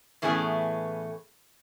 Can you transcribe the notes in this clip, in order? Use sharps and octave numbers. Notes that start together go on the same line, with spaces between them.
A2 E3 A3 B3 C#4 G#4